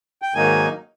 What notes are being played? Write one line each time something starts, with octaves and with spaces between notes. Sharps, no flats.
G5
G#2 D#3 F#3 A#3 D#4 G#5